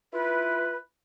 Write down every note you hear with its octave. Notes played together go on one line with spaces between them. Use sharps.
E4 F4 B4